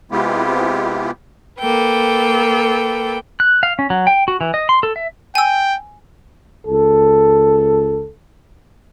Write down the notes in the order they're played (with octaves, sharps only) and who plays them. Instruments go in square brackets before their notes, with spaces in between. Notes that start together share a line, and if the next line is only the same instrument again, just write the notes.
[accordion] C3 G#3 B3 E4 F4 G4
[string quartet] A#3 A4 B4 G5
[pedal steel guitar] F#6
F5
C#4
F#3
G5
F#4
E3
D#5
C6
A4
E5
[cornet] G5 [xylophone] G#5 E6
[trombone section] C#2 A4